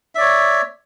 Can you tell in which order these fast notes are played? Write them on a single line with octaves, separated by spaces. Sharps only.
E5 D5 C#5